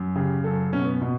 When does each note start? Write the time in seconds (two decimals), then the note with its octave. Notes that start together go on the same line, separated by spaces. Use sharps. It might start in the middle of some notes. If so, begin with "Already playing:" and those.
Already playing: F#2
0.15 C#3 G4
0.44 F#2 A4
0.73 B2 C#4
0.85 B3
1.02 B2